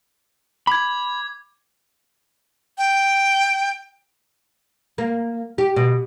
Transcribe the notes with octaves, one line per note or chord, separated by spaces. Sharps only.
B5 D6 G#6
G5
A#3
G4
B2